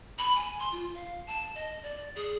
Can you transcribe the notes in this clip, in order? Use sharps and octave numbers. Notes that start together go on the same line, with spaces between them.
B5
G#5
C6
F4
F5
A5
D#5
D5
G#4